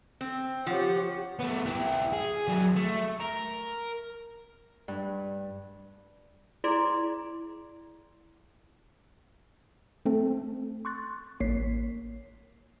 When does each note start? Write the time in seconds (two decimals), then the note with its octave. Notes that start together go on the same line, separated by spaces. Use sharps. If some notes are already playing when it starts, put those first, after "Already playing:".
0.21 C4
0.67 F3 G4 C#5 F#5
1.40 A3 B3
1.66 E4 G4
2.12 G#4
2.48 F#3 D4
2.76 A3
3.21 A#4
4.88 G2
6.64 E4 G#4 D5 A#5 C6
10.05 A3 C4 A4
10.85 C6 C#6 F#6 A6
11.40 A1 A#3 C#5 B6 C7